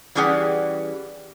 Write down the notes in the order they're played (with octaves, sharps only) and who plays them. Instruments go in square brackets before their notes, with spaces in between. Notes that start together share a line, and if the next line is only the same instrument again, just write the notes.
[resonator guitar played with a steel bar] E3 G3 C#4 G4 G#4 F#5